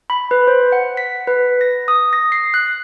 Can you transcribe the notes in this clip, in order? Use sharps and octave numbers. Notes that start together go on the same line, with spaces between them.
B5
B4
C5
F#5
B6
B4
A#6
D#6
A#6
C7
F#6